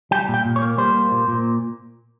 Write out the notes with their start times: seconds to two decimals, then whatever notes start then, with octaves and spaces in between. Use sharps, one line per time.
0.11 G3 G5
0.28 A#2
0.34 G5
0.45 A#2
0.56 C#5
0.61 A#3
0.78 G3 C5
0.95 A#3
1.11 A#2
1.28 A#2